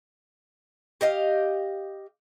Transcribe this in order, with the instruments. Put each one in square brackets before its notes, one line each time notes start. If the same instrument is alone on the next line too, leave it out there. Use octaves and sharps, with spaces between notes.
[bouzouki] G4 D#5 F5